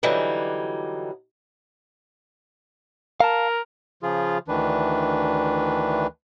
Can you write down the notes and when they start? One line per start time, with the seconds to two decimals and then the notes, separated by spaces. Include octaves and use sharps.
0.03 D3 E3 F#3 G3 D#4
3.20 A#4 F5 A5
4.03 C#3 F3 F4 G#4
4.48 D2 D#3 E3 D4 B4